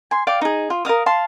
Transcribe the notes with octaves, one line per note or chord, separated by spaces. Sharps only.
G#5 C6
D5 F5 G5 D6
D#4 G#4
F4
A#4 D#5 F5 D#6
F5 A5 C6